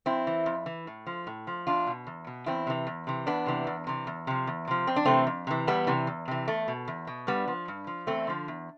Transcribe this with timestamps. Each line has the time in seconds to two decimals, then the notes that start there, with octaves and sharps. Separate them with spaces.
0.06 F2 C4 E4
0.27 E3
0.46 F2
0.66 E3
0.87 A2
1.07 F3
1.27 A2
1.47 F3
1.67 E2 D4 F4
1.87 B2
2.07 E2
2.27 B2
2.46 E2 C4 E4
2.67 C3 E3
2.87 E2
3.07 C3 E3
3.26 E2 B3 D4
3.46 C3 E3
3.67 E2
3.87 C3 E3
4.07 E2
4.27 C3 F3
4.47 E2
4.67 C3 F3
4.87 F2 C4
4.96 D4
5.05 C3 E3 A3 C4
5.27 F2
5.47 C3 E3
5.67 E2 G3 B3
5.87 C3 E3
6.07 E2
6.28 C3 E3
6.48 E2 A3
6.68 B2
6.88 E2
7.07 B2
7.27 G2 G3 B3
7.48 F3
7.68 G2
7.87 F3
8.07 E2 A3 C4
8.27 D3 F3
8.48 E2